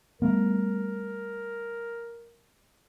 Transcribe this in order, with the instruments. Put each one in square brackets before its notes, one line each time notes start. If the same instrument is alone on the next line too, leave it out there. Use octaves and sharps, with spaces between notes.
[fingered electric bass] G3 A3 B3 [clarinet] A#4